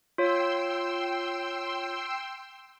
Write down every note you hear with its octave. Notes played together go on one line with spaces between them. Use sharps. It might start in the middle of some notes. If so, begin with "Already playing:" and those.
F4 C#5 G5 C6 E6